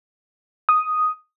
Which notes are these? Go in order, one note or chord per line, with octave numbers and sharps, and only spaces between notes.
D#6